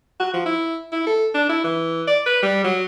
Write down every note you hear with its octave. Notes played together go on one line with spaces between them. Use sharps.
F#4
F3
E4
E4
A4
D4
E4
E3
D5
B4
G3
F#3